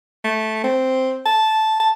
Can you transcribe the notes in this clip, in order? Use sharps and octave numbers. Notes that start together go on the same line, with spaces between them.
A3
C4
A5
A5